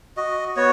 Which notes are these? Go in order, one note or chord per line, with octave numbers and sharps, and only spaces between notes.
F#4 D#5
B3 C#5